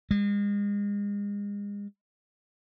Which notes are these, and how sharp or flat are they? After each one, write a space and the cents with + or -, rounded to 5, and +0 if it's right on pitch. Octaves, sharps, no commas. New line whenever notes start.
G#3 -35